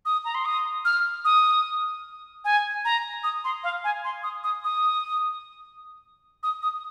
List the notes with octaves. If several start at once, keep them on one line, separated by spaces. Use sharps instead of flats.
D#6
A#5
C6
D#6
F6
D#6
G#5
A#5
D#6
C6
F5
G#5
C6
D#6
D#6
D#6
D#6
D#6